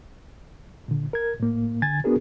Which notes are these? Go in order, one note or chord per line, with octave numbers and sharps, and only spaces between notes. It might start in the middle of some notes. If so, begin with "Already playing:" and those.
A#2 D3
A#4 G#6
A2 A#3
D3 G#5 G#6 A6
B3 D4 F#4 G#4 A#4